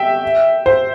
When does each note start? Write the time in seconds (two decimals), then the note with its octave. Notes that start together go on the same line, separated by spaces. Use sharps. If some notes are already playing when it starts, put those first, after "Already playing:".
Already playing: E5 G5
0.66 C5